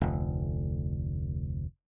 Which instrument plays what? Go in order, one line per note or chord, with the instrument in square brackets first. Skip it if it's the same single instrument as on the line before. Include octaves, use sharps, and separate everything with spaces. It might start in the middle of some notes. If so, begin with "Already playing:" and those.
[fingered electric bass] F1 D2